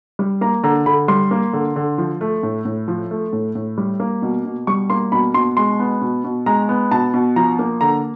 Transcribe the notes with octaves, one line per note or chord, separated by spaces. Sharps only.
G3
A#3 A#5
D3 A#5
D3 B5
G3 C6
A#3
D3
D3
F3
A3
A2
A2
F3
A3
A2
A2
G3
A#3
B2
B2
G3 C#6
A#3 C6
B2 B5
B2 C6
G#3 C6
B3
B2
B2
G#3 A#5
B3
B2 A5
B2
F3 A#5
A#3
D3 A#5